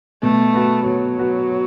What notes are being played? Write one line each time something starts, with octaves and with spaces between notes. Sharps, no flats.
B2 A3
B3 F#4
B2 F#3
B3 F#4